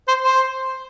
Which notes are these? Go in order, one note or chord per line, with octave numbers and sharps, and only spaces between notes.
C5
C5